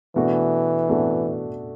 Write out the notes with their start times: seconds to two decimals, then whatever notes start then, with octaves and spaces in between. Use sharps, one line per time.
0.15 B2 E3 A3 D4 F#4
0.89 B2 A3 D4 F#4